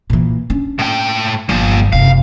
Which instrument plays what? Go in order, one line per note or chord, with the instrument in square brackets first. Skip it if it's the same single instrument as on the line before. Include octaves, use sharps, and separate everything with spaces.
[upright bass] A#2 E3
C#4 D4
[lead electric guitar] A2 G5
[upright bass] G1 [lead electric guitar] A#2 F3
[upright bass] F#1 C3 [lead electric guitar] F5